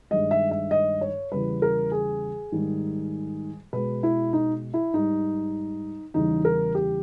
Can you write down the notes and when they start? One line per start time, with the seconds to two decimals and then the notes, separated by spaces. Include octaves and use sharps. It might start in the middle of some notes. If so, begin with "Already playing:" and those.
0.11 G2 D#3 G#3 D#5
0.31 E5
0.51 E5
0.71 D#5
1.01 C#5
1.31 E2 C#3 G3 B4
1.62 A#4
1.92 G#4
2.52 G#2 D#3 G3
3.73 B2 G#3 B4
4.03 E4
4.33 D#4
4.74 E4
4.93 G#2 G3 D#4
6.14 E2 C#3 E3 G3 D#4
6.45 A#4
6.75 G4